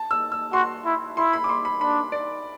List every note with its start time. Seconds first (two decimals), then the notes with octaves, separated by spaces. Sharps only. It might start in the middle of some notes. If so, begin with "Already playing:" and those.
Already playing: A5
0.11 E6
0.32 E6
0.53 F#4 C6
0.85 E4
1.17 E4 C6
1.33 B5
1.44 D6
1.49 C6
1.65 B5
1.81 D4 B5
2.12 D5